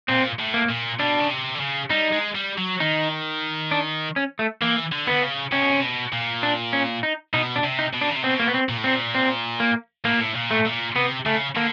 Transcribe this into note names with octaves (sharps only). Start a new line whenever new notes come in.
A#2 C4
A2
A#3
A#2
B2 D4
C#3
C3
D3
C#3
G3 D#4
G#3
G3
F#3
D#3 D#4
D4
C#4
A3
E3 A#3
D3
D3 B3
C#3
C3 C#4
B2
C3
B2
A#2
D4
C#4
D#4
B2 D#4
D4
C3
D#4
B2
D4
C#3
C3
B2 C4
A#3
B3
C4
A#2
A2
A#2 C4
C4
A#3
A2 A#3
A#2
A2
A#2
A3
A#2
C3 B3
C#3 A3
D3 A#3